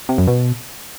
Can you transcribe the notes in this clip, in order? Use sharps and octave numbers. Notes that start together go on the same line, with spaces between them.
C3
F#2
B2